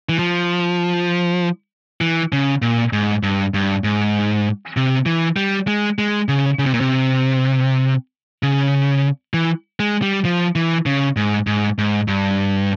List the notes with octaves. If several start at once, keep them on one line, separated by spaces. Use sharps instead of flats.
E3
F3
E3
C#3
A#2
G#2
G2
G2
G#2
C3
E3
G3
G#3
G#3
C#3
C#3
C3
A#2
C3
C#3
E3
G#3
G3
F3
E3
C#3
G#2
G#2
G#2
G2